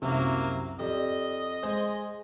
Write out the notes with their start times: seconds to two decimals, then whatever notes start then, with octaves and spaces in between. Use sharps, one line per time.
0.02 C2 F#2 C3 F#3 A#3
0.79 F2 G4 D5 D#5
1.63 G#3 C5